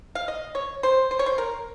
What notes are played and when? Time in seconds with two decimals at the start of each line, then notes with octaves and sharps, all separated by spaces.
0.15 F5
0.28 D#5
0.55 C#5
0.83 C5
1.11 C5
1.19 C#5
1.26 C5
1.38 A#4